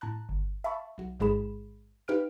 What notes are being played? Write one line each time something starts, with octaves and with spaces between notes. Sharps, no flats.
A2 A5 A#5 F#6
G1
E5 F5 A5 B5 C#6
B1 F#4
A1 G#2 G#3 G#4 B5 E7
D#4 G4 B4 F5 F6 D7